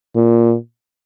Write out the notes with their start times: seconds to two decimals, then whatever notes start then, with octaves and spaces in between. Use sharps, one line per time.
0.16 A#2